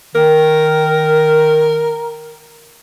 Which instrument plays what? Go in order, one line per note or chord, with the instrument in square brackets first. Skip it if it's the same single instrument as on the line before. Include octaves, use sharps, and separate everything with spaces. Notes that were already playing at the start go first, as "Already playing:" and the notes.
[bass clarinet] D#3 [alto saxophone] A#4